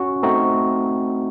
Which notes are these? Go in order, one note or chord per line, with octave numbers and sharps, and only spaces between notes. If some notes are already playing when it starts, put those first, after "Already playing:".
Already playing: C#4 F#4
A3 C4 D#4 F#4